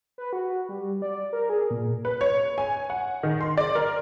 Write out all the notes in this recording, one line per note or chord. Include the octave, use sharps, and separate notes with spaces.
B4
F#4
G3
D5
A#4
G#4
A#2
B4
C#5
G#5
F#5
D#3
C6
D5
A#4